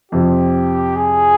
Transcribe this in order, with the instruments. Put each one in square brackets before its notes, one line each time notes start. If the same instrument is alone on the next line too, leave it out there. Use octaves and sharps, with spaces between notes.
[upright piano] F2 C3 F3 [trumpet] G4
[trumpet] G#4